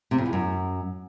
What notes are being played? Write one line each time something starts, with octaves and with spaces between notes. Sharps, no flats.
C3
F2
E2
F#2